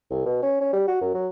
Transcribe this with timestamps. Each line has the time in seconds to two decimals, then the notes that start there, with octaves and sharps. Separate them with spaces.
0.10 C2
0.25 B2
0.42 C#4
0.61 C#4
0.73 G3
0.87 F#4
1.01 F#2
1.14 F#3